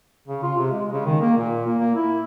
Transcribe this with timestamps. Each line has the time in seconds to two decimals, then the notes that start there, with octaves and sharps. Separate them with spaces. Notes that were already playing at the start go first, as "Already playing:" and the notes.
0.28 C#3
0.43 F4
0.57 C3
0.71 G#3
0.92 C#3
1.06 D#3
1.21 A#3
1.37 A#2
1.67 A#3
1.78 A#3
1.95 E4